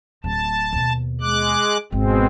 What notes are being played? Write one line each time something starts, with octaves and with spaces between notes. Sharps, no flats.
D1 A5
D#2 B2
G#3 D6 F#6
G#1 B2 G#3 C4